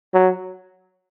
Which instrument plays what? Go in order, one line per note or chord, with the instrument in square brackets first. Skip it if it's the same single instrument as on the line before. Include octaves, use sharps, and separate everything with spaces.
[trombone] F#3